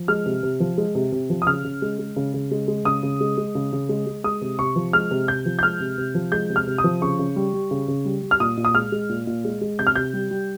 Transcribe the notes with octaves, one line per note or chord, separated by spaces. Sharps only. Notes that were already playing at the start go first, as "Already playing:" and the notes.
Already playing: F3
G#3 F6
C3
C3
F3
G#3
C3
C3
F3
D#6
C#3 F6
C#3
G#3
G#3
C#3
C#3
G#3
G#3
C#3 D#6
C#3
G#3
G#3
C#3
C#3
G#3
G#3
G#3 D#6
C3
C3 C#6
F3
G#3 F6
C3
C3 G6
F3
G6
G#3 F6
C3
C3
F3
G#3 G6
C3
F6
C3
D#6
F3
C#3 C#6
C#3
G3
G3
C#3
C#3
G3
G3
F6
A#2 D#6
A#2
D#6
G#3 F6
G#3
A#2
A#2
G#3
G#3
C3 G6
F6
C3 G6
G3
G3